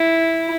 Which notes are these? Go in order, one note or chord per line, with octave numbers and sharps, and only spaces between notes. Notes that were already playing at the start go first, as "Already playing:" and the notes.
Already playing: E4